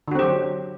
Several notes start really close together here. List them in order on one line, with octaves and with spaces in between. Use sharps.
D3 F#4 C4 G4 F#3